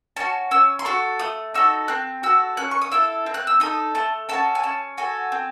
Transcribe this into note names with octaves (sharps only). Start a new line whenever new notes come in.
C#4 F#4 A5
C#4 E6
C6
F#4 A4 C#6
A3 D#6
D#4 F#4 A4 E6
C4 F#6
F#4 A4 E6
C#4 F#6
C#6
D#6
E4 A4 E6
C4
F#6
E6
D#4 A4 D#6
A3 A5
C#4 F#4 A4 A5
G#5
C#4 A5
F#4 A4 G#5
C4